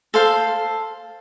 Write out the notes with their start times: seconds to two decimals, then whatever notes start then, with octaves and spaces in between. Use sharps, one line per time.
0.14 A4 C5 F5